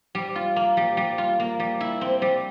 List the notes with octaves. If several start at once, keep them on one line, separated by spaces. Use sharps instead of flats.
G3
F4
A#3
G3
G3
F4
A#3
G3
E4
C4
G3